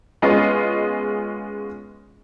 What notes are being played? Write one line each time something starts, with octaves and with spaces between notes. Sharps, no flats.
G#3 B3 C#4 F4 G#4 D#5